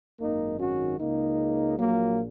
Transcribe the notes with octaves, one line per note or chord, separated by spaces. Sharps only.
G#1 F#2 D#3 A#3 D#4
C#4 F#4
C#2 C#3 A#3 D#4
A#1 A#2 F#3 A#3